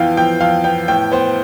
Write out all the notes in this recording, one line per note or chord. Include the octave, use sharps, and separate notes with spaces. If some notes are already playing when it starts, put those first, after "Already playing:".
Already playing: F2 E3 B3 F5 G5
F2 G5
F2 F5
B3 G5
A2 G5
B3 C5